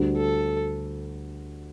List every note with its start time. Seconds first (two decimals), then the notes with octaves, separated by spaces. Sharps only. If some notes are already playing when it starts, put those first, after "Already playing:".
Already playing: D2 D3 G3
0.17 A4